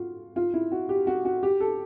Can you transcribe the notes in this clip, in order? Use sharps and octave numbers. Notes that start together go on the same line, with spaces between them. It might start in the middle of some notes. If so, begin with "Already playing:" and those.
Already playing: F4 F#4
F4
E4
F#4
G4
F#4
F#4
G4
A4